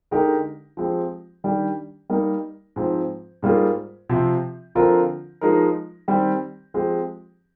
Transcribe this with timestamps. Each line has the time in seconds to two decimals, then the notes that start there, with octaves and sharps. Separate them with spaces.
0.11 D3 G#3 D#4 G4 A#4
0.77 F3 G#3 C4 G4
1.44 D#3 G3 D4 G4
2.10 G3 A#3 D#4 A#4
2.76 G#2 F3 C4
3.42 G#2 G3 A#3 F4 G#4
4.09 C3 F3 C4
4.75 D3 F3 C4 F4 A#4
5.41 F3 G#3 D#4 A#4
6.08 D#3 G3 C4 G4
6.74 F3 G#3 C4 G4